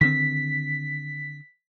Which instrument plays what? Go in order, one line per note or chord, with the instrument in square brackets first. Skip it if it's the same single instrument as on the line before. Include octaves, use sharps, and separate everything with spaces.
[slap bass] D3 D#3 C4 [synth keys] B6